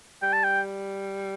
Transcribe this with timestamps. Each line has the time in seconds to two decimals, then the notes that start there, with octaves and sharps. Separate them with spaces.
0.22 G3 G5
0.33 A5
0.44 G5